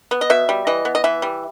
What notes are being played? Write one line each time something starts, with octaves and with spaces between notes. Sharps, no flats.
B3
D#5
B2 E5
G3
E3 D#5
B3
D#5
E3 E5
G3